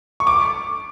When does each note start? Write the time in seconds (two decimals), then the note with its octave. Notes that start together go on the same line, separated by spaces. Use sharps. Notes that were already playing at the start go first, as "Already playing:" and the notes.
0.20 C#6
0.27 D6